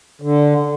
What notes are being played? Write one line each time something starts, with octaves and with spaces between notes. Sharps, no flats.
D3